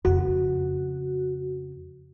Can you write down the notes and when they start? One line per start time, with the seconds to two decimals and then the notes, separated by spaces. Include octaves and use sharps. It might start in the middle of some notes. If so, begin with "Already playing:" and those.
0.05 F2 C#3 F#4